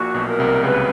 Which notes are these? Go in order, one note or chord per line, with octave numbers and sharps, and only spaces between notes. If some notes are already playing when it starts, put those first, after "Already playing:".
Already playing: A#1 A#2 F#4
B1 B2
A#4
C2 C3
C#2 C#3 B4